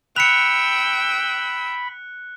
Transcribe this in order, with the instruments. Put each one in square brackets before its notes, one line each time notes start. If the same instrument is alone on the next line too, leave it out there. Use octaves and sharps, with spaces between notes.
[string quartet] G5 E6 [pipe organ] B5 [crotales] F#6 [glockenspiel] C#7 F7